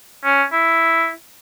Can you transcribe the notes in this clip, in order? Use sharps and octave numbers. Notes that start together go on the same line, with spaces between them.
C#4
E4